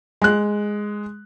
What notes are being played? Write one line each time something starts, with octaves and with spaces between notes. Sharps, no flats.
G#3 F#6